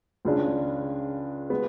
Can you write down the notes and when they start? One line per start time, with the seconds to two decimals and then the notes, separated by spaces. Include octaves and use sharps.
0.25 C#2 C#3 G#3 D4
1.50 G#3 B3